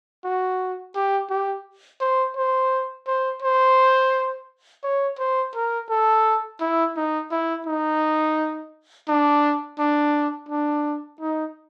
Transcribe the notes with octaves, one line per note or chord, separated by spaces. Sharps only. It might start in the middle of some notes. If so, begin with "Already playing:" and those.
F#4
G4
G4
C5
C5
C5
C5
C#5
C5
A#4
A4
E4
D#4
E4
D#4
D4
D4
D4
D#4